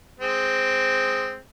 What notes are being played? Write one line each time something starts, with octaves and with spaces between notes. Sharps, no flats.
G#3 C4